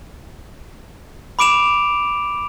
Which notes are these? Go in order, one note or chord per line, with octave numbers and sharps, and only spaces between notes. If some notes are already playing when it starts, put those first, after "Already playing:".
B5 D6 D7 E7 F7